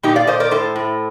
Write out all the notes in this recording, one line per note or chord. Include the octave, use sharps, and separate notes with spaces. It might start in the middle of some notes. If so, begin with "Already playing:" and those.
A#2 D#4 G4
D5 F5
A#2 C5 D#5
A#4 D5
A2 A4 C5
A2